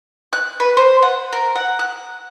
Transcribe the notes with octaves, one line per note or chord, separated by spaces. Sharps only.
F#6
B4
C5
F#5
A#4
F#5
F#6